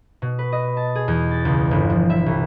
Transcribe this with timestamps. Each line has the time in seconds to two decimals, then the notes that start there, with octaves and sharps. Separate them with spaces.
0.22 B2
0.39 B4
0.52 D#5
0.77 A5
0.95 G#4
1.08 E2
1.31 A6
1.45 C#2
1.71 G1
1.90 F3
2.10 E5
2.26 C2